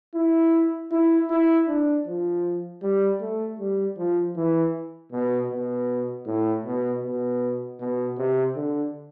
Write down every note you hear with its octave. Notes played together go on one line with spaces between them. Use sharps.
E4
E4
E4
D4
F3
G3
A3
G3
F3
E3
B2
B2
A2
B2
B2
B2
C3
D3